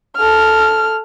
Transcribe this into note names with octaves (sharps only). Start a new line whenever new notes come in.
A4 F6